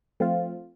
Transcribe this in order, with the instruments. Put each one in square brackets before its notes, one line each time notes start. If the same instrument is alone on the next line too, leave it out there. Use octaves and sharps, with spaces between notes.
[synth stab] F3 A3 C4 F4